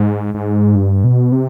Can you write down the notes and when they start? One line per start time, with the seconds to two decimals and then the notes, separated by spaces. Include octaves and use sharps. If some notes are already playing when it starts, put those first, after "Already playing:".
Already playing: G#2
0.34 G#2
0.75 G2
1.04 B2
1.32 C3